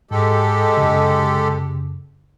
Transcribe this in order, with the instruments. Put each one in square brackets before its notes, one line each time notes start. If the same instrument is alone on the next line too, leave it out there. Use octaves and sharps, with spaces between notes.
[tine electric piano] G#2 [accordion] G#3 G4 A4
[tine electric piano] F#2 C#3